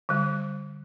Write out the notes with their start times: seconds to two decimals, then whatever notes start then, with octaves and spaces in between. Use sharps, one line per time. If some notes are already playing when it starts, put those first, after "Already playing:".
0.09 D3 G3